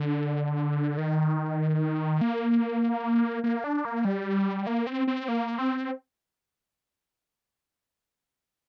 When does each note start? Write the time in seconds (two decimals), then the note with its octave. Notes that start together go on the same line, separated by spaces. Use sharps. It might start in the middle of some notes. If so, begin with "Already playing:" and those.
Already playing: D3
0.98 D#3
2.21 A#3
3.44 A#3
3.64 D4
3.85 A#3
4.05 G3
4.67 A#3
4.87 C4
5.07 C4
5.28 A#3
5.58 C4